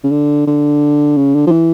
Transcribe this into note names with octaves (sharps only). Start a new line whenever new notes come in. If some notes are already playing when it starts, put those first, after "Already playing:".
C#3
D3
D3
C#3
D3
F3
E3